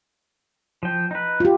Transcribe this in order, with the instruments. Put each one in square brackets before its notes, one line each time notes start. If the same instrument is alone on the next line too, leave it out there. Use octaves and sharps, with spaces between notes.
[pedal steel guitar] F3 G5
D#4 B4
[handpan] F4 G4